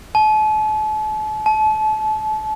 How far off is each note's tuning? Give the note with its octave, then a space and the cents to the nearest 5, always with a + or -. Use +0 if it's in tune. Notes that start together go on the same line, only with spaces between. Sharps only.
A5 -40
A5 -30